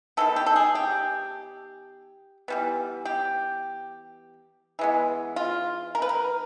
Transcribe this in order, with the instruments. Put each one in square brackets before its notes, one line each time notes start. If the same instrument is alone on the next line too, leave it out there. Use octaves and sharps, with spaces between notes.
[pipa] D#3 G#3 B3 A4
G4
A4
G#4
G4
E3 G3 B3
G4
E3 G#3 B3
F4
A#4
B4
A#4